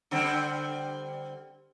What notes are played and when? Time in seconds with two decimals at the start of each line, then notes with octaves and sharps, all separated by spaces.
0.11 D3 G3 C4